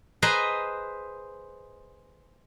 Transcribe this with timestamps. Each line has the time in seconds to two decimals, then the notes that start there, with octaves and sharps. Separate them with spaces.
0.22 G#4 B4 C5 D#5 G#5 A#5